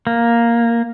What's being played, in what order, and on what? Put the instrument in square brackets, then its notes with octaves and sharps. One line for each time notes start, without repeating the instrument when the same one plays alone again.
[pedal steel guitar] A#3